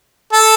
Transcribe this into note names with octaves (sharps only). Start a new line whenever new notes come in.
A4